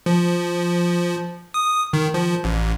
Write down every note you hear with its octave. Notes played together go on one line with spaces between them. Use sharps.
F3
D#6
D#3
F3
A1